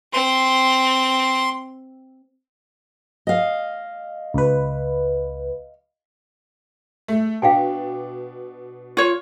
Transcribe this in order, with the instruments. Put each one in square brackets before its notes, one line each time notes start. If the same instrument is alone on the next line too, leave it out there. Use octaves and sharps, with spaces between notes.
[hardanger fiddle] C4 [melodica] C6
[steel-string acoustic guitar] D#5 F5
[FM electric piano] C#2 B4
[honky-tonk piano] A3
[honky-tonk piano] B2 D4 [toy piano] F5 G5 G#5
[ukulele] F4 C#5 [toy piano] C#6